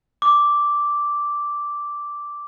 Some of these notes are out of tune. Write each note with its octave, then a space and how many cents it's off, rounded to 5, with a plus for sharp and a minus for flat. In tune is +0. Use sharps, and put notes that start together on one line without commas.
D6 -5